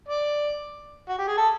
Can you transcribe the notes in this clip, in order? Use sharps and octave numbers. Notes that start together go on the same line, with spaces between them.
D5
F#4
G4
G#4
A4